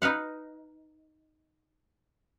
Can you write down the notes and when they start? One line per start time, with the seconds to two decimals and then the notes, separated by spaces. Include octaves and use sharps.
0.02 D#4 B4 F5 F#5